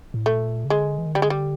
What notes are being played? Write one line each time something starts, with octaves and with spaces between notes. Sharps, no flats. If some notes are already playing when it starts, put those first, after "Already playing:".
A2
A#2 A3
C#3
D3 G#3
E3
D#3
D3 G3
G#3
G3